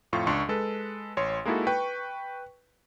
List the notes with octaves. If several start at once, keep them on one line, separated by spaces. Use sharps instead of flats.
F2 A2 F4 C#6
C#2 D4 C6 C#6
G#3 A4 B4
A1 C#5 C6
G#3 A#3 D#4 E4 F#4 A4
B4 G5 C#6